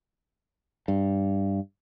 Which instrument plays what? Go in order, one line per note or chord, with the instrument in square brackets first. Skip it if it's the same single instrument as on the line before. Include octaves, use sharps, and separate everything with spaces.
[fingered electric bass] G2